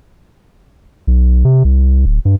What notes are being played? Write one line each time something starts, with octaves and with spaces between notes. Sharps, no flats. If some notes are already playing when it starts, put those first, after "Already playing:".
B1
C3
C2
D1
G2